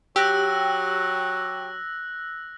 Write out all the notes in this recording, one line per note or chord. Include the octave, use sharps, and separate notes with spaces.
F#3 G4 E6 F#6 A#6